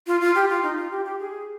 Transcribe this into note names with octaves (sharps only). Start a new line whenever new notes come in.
F4
F4
G4
F4
D#4
F4
G4
G4
G#4